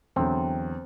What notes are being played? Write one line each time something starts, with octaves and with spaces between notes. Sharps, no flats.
E2 D3 F#3 C4